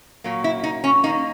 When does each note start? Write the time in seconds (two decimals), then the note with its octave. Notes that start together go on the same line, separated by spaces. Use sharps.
0.24 A#2 F#3 A#3
0.44 E4
0.63 D#4
0.84 C#4
1.03 D#3 A#3 D#4